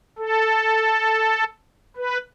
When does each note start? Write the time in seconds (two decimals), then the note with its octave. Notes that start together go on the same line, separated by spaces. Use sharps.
0.18 A4
1.97 B4